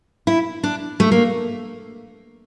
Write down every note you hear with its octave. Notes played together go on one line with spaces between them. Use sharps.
E4
D4
A3
A#3